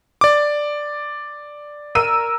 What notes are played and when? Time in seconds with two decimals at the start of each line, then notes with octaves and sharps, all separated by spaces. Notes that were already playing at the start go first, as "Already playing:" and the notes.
0.21 D5 D6
1.95 A#4 E6 D#7